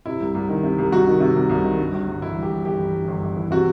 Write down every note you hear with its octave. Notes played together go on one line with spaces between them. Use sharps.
C3 E4
C2
C2
D#3
C3
C2
C2 F#4
D#3
C3
C2
C2
D#3
G2
G1
G1
E3 E4
G2
G4
G1
G1 G4
E3
G2
G1
G1
E3
C3 F#4